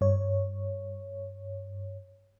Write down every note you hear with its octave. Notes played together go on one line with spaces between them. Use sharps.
G2 C#5